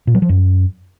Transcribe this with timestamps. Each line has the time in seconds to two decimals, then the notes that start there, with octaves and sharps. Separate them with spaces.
0.07 A#2
0.15 F#3
0.22 F3
0.29 F#2